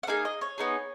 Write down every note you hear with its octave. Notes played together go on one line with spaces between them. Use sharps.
F#5
A#3 D#4 G#4 F5
D#5
C#5
B3 D#4 G#4